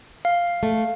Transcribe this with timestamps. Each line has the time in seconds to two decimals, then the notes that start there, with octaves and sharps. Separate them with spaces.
0.25 F5
0.63 A3